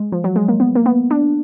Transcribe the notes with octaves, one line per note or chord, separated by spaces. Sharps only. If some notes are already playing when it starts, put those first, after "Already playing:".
Already playing: G#3
F3
F#3
G#3
A#3
B3
A#3
B3
D4